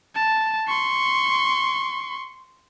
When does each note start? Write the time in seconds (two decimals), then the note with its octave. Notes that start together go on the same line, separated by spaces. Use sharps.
0.16 A5
0.68 C6 C#6